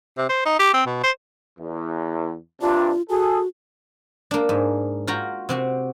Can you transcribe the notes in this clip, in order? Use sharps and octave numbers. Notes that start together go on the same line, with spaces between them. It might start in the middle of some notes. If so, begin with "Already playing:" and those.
C3
C5
D#4
G4
C4
B2
C5
E2
G2 C3 D4 F4
F#4 G#4 A4
A#3 D4
G#2
F4 F#4 G5 A#5
C3 C4 F#4